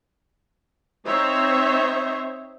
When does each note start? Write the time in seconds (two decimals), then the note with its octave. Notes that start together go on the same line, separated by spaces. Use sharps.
1.06 C4 D#4 C5 C#5 E5